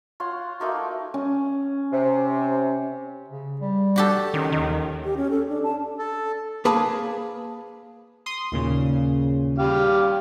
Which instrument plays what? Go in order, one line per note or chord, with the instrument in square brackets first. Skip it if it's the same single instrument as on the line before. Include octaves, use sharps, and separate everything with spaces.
[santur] F4 C#5 F#5 C6
A3 A#3 D#4 F#4
[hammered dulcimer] C#4
[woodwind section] C3
[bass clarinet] C#3
G3
[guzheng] F#4 G4 A4
[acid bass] D#3 [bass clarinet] C#4
[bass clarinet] D#2 [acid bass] D#3
[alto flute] G4
C#4
A4
D4
A5
[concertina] A4
[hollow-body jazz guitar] A#3 G#4 B4 A5 B5
[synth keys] C6 D#6
D#2 A#2 C#3
[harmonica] G3 G4 F5